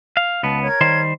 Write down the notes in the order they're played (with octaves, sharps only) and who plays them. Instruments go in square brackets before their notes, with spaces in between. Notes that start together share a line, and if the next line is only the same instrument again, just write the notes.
[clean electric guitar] F5
[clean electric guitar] C#2 B3 [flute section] A5
[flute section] A#4 C#5 G#6
[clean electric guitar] D#3 G3 C5